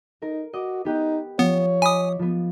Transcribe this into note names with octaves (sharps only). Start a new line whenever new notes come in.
D#4 A#4
F#4 D#5 D6
B3 D#4 G4 F#5
F3 B3 C#5
D#5 G#5 B5 D6 D#6
F3 B3